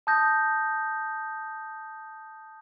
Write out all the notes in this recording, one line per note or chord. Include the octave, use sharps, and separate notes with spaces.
A5 D#6 G6 A#6